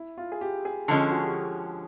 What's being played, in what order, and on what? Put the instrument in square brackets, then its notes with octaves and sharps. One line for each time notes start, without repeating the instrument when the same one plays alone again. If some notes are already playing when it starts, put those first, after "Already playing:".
Already playing: [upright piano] E4
F4
G#4
G4
G#4
[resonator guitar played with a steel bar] D3 F3 G#3 C#4 [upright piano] A4
[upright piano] G#4
F#4
G4